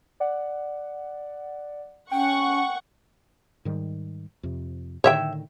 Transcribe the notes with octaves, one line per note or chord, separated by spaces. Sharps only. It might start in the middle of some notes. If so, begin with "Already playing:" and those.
D5 F#5
C#4 F#5 G5 C#6
G#2 D#3 G3
F2 C3
A2 D3 D#3 C#5 E5 G5